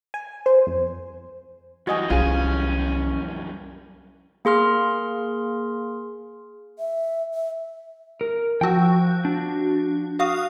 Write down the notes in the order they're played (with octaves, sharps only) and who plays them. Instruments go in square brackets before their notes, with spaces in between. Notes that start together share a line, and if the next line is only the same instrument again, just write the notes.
[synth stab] G#5
C5
F2
[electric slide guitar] F#2 E3 G3 [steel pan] F#4 D#5 G#5
[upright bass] C2 [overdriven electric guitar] C#4 [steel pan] F4 G#4
[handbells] A#3 G#4 C6 F6
[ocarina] E5
E5
[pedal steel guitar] A#4
[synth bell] F3 F#4 [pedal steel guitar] G5 E6
[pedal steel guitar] D4
[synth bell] F#4 F5 D#6